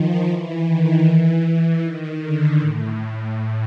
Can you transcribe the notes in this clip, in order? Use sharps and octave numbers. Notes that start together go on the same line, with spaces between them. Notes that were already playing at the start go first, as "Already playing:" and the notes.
Already playing: D#3 F3
E3
D#3
E3
E3
D#3
D3
A2